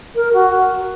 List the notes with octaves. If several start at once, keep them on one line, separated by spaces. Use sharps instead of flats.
A#4
F#4